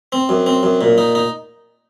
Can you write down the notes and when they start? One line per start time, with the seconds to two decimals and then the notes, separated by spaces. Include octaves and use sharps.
0.12 C4
0.29 F#2
0.46 C4
0.63 F#2
0.81 A#2
0.98 D#4
1.15 D#4